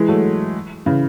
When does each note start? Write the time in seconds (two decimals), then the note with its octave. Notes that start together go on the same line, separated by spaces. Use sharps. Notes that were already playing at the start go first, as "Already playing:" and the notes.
Already playing: E3 G#3
0.09 F#3 A3
0.86 C#3 E3